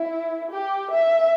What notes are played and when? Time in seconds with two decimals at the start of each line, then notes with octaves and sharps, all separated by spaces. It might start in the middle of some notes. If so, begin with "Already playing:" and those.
Already playing: E4
0.51 G4
0.91 E5